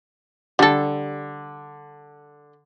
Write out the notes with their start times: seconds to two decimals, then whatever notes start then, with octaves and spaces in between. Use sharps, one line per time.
0.59 D3 G3 A4